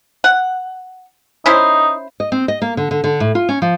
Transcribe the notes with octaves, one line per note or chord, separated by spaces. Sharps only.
F#5
C#4 D#4 E4 C5
D#5
C4
D#5
A#3
D3
D3
D3
A2
F4
C#4
F3